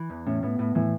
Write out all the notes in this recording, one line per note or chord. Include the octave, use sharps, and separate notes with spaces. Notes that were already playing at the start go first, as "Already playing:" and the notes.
Already playing: E3
E2
A2 C#4
A2 B3
A2 B3
A2 E3